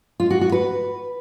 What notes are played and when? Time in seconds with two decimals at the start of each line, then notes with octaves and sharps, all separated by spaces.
0.20 F4
0.30 F#4
0.41 F#4
0.52 B4